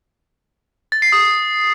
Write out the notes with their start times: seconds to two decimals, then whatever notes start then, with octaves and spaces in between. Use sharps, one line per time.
0.92 A6
1.02 C7
1.12 D#6